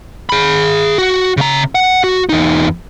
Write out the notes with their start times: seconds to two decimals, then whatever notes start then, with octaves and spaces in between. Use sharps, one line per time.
0.29 G#4 B5
0.98 F#4
1.37 C#3 A#5
1.75 F#5
2.04 F#4
2.29 E2 D#4